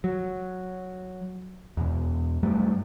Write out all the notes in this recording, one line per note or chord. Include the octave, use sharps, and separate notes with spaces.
F#3
E2 B2
G2 F#3 G3 A3